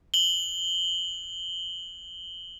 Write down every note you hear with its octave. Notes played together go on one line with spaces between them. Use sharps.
F#7 G7